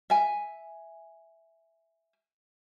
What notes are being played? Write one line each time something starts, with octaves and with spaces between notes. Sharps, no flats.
E5 G#5